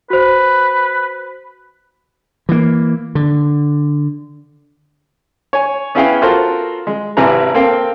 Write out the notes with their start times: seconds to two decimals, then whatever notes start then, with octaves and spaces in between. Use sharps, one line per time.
0.10 F#4 B4 C5
2.49 E3 A#3
3.15 D3
5.53 C#5 G#5
5.95 B3 C#4 E4 G#4 F5 G5
6.22 F4 F#4 A4 A#4 C5
6.87 G#3
7.17 G#1 C3 E4 B4 G#5 A#5
7.54 A#3 C4 A4 F5 G5